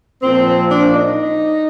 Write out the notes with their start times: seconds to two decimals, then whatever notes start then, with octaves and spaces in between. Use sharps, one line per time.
0.22 A#2 F3 C4
0.70 D4
0.93 D#4